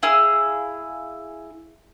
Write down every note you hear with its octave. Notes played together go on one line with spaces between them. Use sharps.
E4 G#4 F5 E6